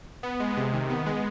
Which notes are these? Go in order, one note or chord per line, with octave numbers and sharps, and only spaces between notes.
B3
G#3
C3
D#3
B3
G#3